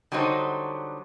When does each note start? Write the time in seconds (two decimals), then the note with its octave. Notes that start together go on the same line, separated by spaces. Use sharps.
0.12 D3 F#3 G3 D4 D#4 C5